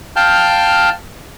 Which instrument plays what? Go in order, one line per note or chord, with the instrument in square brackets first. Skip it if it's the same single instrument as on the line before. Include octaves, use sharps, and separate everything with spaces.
[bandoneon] F5 G5 A5 F6 G6